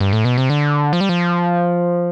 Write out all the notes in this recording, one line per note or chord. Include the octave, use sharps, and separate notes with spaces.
G2
A2
B2
C3
D3
F3
G3
F3